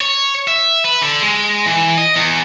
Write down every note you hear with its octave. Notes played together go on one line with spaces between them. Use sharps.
C#5
E5
B4
D3
G#3
E3
D#5
E2